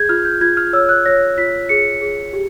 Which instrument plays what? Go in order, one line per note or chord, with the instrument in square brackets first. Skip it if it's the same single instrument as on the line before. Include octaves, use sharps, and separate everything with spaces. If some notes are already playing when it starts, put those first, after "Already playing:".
Already playing: [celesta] G#4 G6 G#6
F4 F6
G6
F4 G#6
F6
C#5 E6
F#6
C#5 A#6
F4 B6
G#4 C#7
G#4
G4